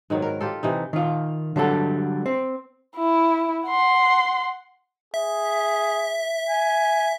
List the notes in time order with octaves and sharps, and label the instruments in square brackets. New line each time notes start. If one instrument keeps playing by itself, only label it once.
[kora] G#2 D#3 F#3 B3
A#4
F4 G4 A4
C3 E3 D#4
[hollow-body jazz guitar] D#3 F4
D3 F#3 G3 A4
C4
[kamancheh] E4
F#5 C6
[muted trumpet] G#4 [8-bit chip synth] E5
[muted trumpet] G#5